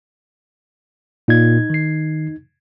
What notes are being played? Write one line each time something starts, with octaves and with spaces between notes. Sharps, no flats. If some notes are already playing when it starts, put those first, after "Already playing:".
A#2 D#4 G#6
D#3 C7